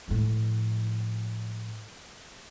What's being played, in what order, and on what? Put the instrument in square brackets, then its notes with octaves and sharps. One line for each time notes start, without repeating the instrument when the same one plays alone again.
[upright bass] A2 F3